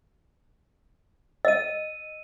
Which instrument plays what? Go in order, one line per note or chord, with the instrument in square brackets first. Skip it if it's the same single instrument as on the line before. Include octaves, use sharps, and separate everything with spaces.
[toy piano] D#5 [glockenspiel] E6 D#7